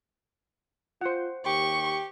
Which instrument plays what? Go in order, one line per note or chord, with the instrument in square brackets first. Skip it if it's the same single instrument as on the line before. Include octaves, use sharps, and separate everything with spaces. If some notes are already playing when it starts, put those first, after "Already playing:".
[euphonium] F4 [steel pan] C5 F#5
[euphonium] D#2 [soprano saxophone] G4 [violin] C#6